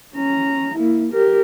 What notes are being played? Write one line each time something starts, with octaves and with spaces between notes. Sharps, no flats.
C#4 A#5
A#3 E4
G4 A#4